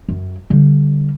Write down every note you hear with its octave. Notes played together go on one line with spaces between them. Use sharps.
F#2
D3 G3